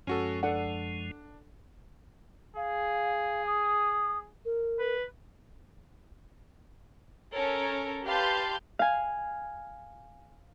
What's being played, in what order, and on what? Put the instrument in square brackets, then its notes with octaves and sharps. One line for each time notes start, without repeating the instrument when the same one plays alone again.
[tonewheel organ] F#2 F3 G#3 [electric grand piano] C#4 F#4 A4
[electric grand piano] D4 [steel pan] A4 D5 F#5
[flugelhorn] G#4 [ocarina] F5
[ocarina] D#6
A#4
[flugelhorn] B4
[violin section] C#4 A4 A#4 C#5
G4 B4 F5 A5 C6 G6
[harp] F5 G#5